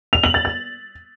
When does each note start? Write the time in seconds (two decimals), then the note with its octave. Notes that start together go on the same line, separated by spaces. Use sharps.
0.13 F7
0.23 F#7
0.34 A6
0.45 A6